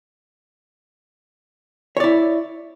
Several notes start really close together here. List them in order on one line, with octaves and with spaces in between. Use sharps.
C#5 D5 E4